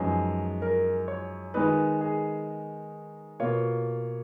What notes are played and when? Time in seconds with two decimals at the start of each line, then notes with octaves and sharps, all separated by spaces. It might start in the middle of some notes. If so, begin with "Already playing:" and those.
Already playing: F#2 F3 G#3 B3 D#4 G#4
0.62 A#4
1.08 C#5
1.54 D#3 G#3 B3 D#4 B4
2.01 G#4
3.40 B2 A#3 F4 C#5